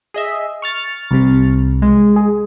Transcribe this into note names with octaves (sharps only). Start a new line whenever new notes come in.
G#4 D#5 E5
C#6 F6 A6
C2 C3
G#3
G#4